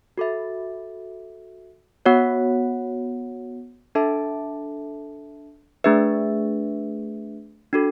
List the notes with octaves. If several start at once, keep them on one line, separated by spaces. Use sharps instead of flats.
F#4 A4 E5
B3 F#4 C#5 F#5
D4 A4 E5 A5
A3 D4 G#4 B4 E5
D4 F#4 A4